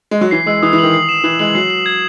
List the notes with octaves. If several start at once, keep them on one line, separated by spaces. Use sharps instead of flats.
G#3
F#3
E3 C7
G#3 E6
E3 D#6
E3
D#3 F#7
C7
E7
E3 F#7
G#3 F#7
F#3 C7
F#7
G#6